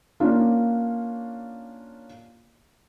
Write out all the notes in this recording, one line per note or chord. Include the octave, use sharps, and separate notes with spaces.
A#3 C#4 D4 F4